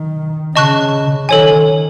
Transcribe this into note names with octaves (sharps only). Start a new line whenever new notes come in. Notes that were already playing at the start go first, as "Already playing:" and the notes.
Already playing: D#3
C#3 D#5 A5 C#6 F#6
D#3 A4 C#5 G#5